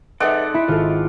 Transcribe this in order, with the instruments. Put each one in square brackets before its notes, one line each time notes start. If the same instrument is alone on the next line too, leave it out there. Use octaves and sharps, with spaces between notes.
[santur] G#3 D5 F#5 [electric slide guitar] D#4 A4 [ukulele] B4 C5 E5
[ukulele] D#4 E5 [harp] E4 B6 C#7
[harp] G#1 [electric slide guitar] F4 [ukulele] A4 E5